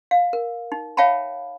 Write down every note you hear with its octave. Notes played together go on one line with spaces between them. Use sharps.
F5
A#4
D#4
C#5 E5 F5 G5 A5 B5